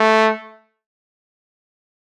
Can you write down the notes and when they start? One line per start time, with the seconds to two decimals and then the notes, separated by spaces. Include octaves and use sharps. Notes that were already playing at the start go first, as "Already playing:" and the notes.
Already playing: A3